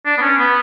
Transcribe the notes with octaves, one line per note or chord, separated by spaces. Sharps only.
D4
B3
C#4
B3